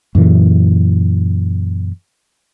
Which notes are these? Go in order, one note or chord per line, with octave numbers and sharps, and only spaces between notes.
F#2 A#2 E3